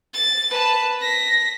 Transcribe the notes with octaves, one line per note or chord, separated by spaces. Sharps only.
A6
B4 A5
A#6 B6